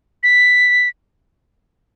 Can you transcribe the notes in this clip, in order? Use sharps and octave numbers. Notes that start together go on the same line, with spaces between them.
B6